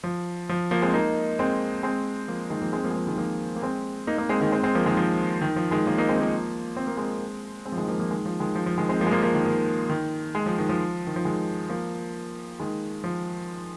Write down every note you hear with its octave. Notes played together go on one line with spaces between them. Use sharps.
F3
F3
F3 A#3
G#3 C4
A#3 D#4
G#3 C4
G#3 C4
F3 A#3
D#3 G#3
F3 A#3
G#3 C4
F3 A#3
G#3
F3
D#3 G#3
F3 A#3
A#3
G#3 C4
A#3 D#4
A#3 D#4
G#3 C4
D#3 G#3
G#3 C4
G#3 C4
F3 A#3
D#3 G#3
F3
D#3
F3
D#3 G#3
F3 A#3
A#3 D#4
G#3 C4
F3 A#3
C4
A#3
G#3 C4
G#3 C4
F3
D#3 G#3
F3 A#3
F3 A#3
D#3 G#3
F3
D#3 G#3
F3
F3
D#3 G#3
G#3 C4
F3 A#3
G#3
F3 A#3
F3 A#3
D#3
D#3
D#3
G#3
F3
D#3
F3
D#3
F3
D#3 G#3
F3 A#3
D#3 G#3
F3